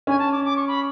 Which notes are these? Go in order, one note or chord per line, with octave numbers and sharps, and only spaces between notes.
C#4 G#5
A5
D6
D6
C#6
B5